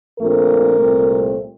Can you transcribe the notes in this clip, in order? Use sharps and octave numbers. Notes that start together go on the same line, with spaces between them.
A#1 A#2 A3 C4 A#4
C2 A#2 A3 C4